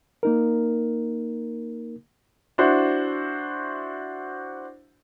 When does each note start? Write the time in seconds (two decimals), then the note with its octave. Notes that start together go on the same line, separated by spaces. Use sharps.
0.23 A#3 D#4 A#4
2.58 D4 E4 F#4 C5